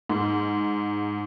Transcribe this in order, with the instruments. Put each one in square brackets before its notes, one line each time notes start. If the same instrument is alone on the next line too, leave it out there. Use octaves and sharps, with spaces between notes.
[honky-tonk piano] G#2